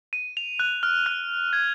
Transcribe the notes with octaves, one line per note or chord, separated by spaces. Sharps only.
D#7
F7
F#6
F6
F#6
G#6